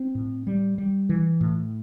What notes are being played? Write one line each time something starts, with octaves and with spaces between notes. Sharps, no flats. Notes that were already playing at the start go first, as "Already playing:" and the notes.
Already playing: C4
A2
G3
G3
E3
A2